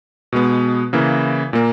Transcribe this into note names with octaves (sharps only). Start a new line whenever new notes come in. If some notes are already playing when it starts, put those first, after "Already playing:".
B2 G#3 B3
C#3 E3 A#3 E4
A#2 A#3